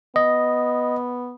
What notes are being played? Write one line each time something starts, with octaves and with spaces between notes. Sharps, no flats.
B3 D#5